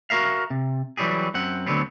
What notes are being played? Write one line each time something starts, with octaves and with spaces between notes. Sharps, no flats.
F#4 G4 A#4 E5 F5
C3
E3 F#3 G3 G4 G#4
F#2 C4 F#5
D2 D3 F#3 B3 C4